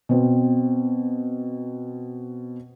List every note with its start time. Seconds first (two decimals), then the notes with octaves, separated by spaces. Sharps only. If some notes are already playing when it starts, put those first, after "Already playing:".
0.09 B2 C4